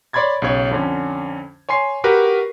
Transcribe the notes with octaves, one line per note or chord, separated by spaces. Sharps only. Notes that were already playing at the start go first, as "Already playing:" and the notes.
C#5 D5 B5 C6 G#6 A6
B1 C#3 C#5
F2 D3 C#4
C#5 G#5 C6 C7
F#4 G4 A#4 B4